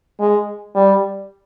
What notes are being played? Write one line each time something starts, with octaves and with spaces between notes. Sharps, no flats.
G#3
G3